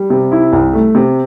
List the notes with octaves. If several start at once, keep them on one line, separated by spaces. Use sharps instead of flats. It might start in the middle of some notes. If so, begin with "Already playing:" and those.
Already playing: G3
C3
E4
C2
A3
C3